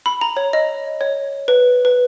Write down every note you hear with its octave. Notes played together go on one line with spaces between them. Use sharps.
B5
A#5
C#5
D#5
C#5
B4
B4